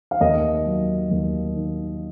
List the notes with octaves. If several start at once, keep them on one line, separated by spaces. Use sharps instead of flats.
F5
D#2 D#5
F#3
D#2
D#3